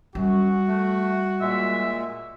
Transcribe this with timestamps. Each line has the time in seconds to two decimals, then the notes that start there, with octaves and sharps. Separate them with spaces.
0.15 F#2 G3 F#4
0.68 A3
1.41 A#2 G#3 E5